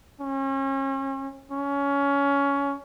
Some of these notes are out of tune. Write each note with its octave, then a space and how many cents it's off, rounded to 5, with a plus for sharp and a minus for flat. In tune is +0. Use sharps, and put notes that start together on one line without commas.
C#4 -35
C#4 +20